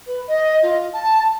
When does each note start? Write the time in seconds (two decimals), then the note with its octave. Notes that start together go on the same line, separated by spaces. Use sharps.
0.07 B4
0.28 D#5
0.63 F4
0.93 A5